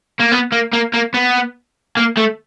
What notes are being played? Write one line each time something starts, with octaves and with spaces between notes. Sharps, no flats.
A#3
B3
A#3
A#3
A#3
B3
A#3
A3